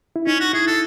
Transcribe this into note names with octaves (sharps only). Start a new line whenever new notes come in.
E4
C#4 D#4
F#4
E4 G#4
A4